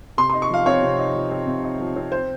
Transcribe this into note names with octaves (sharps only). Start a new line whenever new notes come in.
C3 C6
D#4 C6
C#6
F3 F5
C4 C#5
C3
D#4
F3
C4
C3
D#4
F3
C4
C5